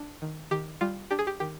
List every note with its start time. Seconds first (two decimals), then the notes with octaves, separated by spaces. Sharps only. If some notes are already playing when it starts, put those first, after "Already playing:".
Already playing: D4
0.22 D#3
0.51 D#3 G4
0.81 G3 F4
1.10 D4 G4
1.19 G#4
1.27 G4
1.40 D#3 G4